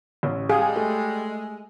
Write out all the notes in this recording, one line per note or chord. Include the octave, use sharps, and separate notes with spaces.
A1
G3 G#3 G#4 F5
A3